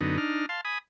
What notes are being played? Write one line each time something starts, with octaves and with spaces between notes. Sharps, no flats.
F#2 D3 B3 D#4
D4 D#4 F6
F5 A5 C6
G#5 B5 D#6